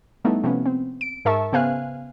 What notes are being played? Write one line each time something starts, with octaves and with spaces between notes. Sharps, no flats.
G3 A3 B3 D#4 E4
C3 F3 B3 C#4
C4
D7
G#2 A#4 E5 A5 C#6
C#3 B3 C5 F5 G#5 F#6